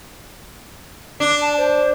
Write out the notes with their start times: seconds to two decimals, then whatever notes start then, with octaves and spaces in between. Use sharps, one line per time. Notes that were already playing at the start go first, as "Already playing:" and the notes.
1.20 D4
1.41 A5
1.57 C5